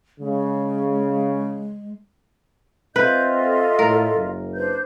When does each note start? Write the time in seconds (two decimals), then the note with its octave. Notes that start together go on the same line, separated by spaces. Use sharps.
0.20 C#3 G#3
2.96 C4 F4 B4 D#5 E5 G6
3.37 A4
3.79 A2 A#4
4.13 F#1
4.55 D4 B4 C5 G6